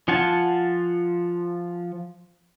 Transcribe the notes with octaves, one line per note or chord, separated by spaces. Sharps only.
F3 F4 F#5 G#5 A5